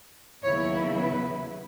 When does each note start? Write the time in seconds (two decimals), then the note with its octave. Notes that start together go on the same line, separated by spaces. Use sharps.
0.43 D#2 C#3 F#3 B3 E4 C#5
0.99 B4